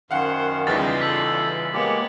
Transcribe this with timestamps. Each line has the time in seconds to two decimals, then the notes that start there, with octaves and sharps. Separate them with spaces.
0.11 F#2 D#3 C5 F5 F#5
0.67 E2 C#3 E3 G3 D#4 F4 A6 B6
1.01 A4 B6 F#7
1.73 G#3 A#3 B3 G4 C#5